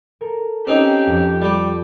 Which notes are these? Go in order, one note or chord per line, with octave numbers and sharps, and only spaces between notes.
A4 A#4
C4 C#4 D#4 G4
F2 F4 G5
G3 G4